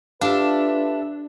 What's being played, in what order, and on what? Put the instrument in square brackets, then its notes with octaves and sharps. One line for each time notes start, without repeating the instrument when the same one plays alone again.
[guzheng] D4 [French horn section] F4 B4 [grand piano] G4 F5 [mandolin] A4 E5